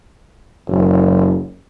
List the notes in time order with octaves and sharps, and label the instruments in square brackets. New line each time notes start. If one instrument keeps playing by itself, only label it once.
[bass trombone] F#1